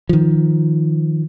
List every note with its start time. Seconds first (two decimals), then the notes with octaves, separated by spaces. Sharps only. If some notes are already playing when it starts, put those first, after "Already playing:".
0.09 D#3 F3